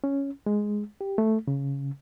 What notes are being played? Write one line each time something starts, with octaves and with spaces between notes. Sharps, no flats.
C#4
G#3
G4
A3
C#3